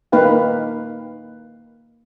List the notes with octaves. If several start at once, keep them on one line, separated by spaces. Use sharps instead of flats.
A#3 D#4 B4 F5 G5